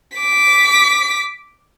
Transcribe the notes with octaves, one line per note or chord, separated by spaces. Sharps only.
D6 B6